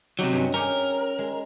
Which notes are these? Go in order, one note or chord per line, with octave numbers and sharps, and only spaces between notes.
C3 F#3 D#4 F#4 G4
G2 C#4
C#4 G4 G#4 A#4
G#3